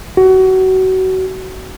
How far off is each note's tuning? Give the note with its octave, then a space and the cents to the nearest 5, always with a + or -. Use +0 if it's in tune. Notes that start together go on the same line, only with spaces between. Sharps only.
F#4 +25